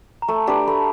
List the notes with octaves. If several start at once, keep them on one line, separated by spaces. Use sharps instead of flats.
A#5
A3 A5
D4 G4 B4
A#5
A3 B5